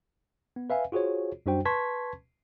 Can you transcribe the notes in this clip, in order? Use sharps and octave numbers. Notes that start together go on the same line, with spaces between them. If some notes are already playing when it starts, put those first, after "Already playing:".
B3
B4 E5 F5 G#5
F4 F#4 G#4 C5 C#5
F#2 G3 D4 F#4 C5 G5
B4 A5 C6 C#6 G#6 B6